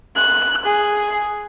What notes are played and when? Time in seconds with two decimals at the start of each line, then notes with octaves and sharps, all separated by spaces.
0.16 F#6
0.65 G#4